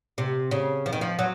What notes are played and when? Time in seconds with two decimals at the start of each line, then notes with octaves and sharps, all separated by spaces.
0.18 C3
0.51 C#3
0.86 F3
0.93 D#3
1.01 F3
1.19 F#3